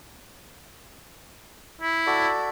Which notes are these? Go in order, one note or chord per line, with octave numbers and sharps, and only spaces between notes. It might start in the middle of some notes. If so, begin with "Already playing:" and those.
E4
F#4 A4 D5